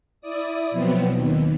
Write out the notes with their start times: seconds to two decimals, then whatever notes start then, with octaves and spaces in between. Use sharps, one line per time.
0.21 E4 D5 D#6
0.71 B2 F3 F#3 B3 C4
1.11 D#2 D#3